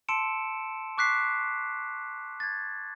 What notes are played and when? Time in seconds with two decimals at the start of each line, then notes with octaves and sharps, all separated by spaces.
0.09 A5 C6 E6 C#7 D7 E7
0.98 C#6 D6 F#6 B6 C7
2.40 G#6 A6